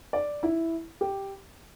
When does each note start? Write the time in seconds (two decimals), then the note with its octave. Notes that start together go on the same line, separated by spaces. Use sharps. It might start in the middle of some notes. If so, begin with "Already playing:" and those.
0.13 D5
0.43 E4
1.01 G4